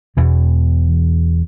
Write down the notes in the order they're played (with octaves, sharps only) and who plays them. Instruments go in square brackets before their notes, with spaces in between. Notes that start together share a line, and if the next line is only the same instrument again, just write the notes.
[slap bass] E1 E2 B2 E3